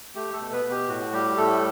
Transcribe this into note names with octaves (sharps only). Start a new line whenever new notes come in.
A3 G4
A3 A4
B2
B3 B4
B2
G4
A2 F#4
G3 G4
A2 A3 A4